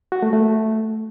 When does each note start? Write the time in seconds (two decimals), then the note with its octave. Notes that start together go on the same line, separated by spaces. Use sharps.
0.12 F#4
0.22 A3
0.33 A3